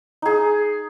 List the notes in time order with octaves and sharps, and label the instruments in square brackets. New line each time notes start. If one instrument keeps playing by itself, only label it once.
[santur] D#4 G#4